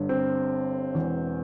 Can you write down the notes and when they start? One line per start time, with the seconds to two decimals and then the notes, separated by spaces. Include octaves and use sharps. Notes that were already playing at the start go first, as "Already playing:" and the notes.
Already playing: G1 G2 D3
0.09 C4
0.95 E1 E2 E3